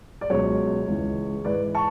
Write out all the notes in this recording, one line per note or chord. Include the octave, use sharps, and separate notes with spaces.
D5
C#2 B2 F#3 C#5
C#2 C#3 E3
G#2 E3 B4 D5
A5 C#6